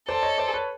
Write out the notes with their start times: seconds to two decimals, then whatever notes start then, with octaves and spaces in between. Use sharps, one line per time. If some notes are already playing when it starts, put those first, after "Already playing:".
0.08 A4 C5 D5
0.23 C#5 D#5
0.38 C5 D5
0.54 B4 C#5